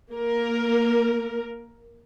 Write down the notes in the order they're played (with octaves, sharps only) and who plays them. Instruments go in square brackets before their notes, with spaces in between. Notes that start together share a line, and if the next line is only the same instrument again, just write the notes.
[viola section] A#3 A#4